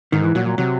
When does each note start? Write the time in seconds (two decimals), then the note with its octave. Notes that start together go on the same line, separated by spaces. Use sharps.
0.12 G#2 D#3
0.24 E3
0.35 A#2 F#3
0.46 F#3
0.58 C3 F#3